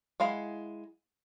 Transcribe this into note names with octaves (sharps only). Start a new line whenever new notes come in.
G#3 E4 F5 F#5